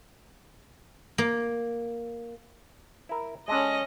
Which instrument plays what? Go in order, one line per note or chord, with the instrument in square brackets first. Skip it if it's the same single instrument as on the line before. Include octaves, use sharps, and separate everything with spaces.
[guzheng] A#3
[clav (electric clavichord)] E4 A#4
[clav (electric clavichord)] G#3 D4 A4 [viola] C#4 D#5